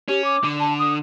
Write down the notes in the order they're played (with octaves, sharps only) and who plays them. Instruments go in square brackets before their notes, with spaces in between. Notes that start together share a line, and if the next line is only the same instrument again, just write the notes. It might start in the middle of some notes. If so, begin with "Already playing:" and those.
[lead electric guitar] C#4 [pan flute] G4
[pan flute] D6
[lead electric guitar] D3
[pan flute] A5
D#6